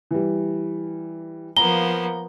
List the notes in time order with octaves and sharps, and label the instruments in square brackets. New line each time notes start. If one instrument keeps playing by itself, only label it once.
[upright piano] E3 G3
[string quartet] F3 A#3 B3 [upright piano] A#5 [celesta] G7